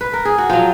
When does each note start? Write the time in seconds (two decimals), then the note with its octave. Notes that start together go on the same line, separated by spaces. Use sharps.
0.01 B4
0.14 A#4
0.25 G#4
0.38 F#4
0.50 F3 F#3 F4